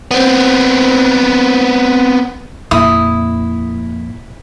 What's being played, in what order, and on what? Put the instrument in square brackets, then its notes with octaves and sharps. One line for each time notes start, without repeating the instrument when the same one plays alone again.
[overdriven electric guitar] B3 C4
[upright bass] F2 A#2 [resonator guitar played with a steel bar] E4 [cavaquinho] D#6